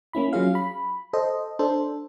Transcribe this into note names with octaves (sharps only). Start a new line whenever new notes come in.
A#3 C#4 E4 B5
F#3 C#4 F4 G#4 F5
B5
A4 C5 D#5
D4 A4 C5